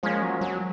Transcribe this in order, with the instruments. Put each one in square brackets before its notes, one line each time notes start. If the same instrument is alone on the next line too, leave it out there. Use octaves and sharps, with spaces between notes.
[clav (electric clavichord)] F3 A#3 C#4 [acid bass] G#3
[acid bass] F#3
F#3